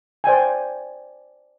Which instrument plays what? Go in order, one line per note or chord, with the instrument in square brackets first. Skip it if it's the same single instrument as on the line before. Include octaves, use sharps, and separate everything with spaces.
[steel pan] C5 D5 G5 G#5